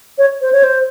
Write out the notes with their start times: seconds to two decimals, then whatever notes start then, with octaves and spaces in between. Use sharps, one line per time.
0.18 C#5
0.41 C5
0.52 C#5
0.63 C5